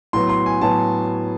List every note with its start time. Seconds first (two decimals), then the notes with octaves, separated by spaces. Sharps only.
0.13 A2 F#3 B3 C6
0.29 C6
0.46 G#5
0.61 A2 F#3 B3 A5